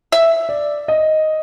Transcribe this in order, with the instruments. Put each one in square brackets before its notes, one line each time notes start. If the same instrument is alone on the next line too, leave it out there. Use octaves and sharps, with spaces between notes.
[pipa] E5
[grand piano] D5
D#5